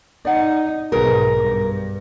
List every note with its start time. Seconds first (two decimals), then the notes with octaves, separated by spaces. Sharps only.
0.25 D#4 D5 F#5
0.92 B1 G#2 G#4 A#4 B4
1.35 G2